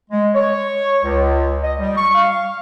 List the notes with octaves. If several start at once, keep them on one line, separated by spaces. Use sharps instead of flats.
G#3
C#5
C#2
D#5
G3
C#6
F5